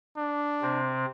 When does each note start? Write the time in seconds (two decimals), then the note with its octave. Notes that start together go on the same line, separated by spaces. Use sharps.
0.17 D4
0.62 C3 C4